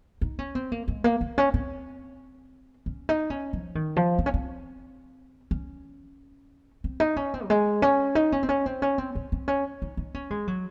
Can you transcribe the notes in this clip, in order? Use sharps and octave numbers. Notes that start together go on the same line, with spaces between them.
D#4
C#4
C4
A#3
G#3
A#3
A#3
C#4
C4
C#4
D#4
C#4
F3
D#3
F3
C4
C#4
C4
C#4
C4
D#4
C#4
C4
F#3
G#3
C#4
D#4
C#4
C4
C#4
C4
C#4
C4
C4
C4
C#4
D#4
D#4
C#4
G#3
F#3